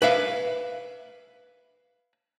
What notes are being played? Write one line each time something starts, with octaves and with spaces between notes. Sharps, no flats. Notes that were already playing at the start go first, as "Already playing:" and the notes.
B4 E5 F5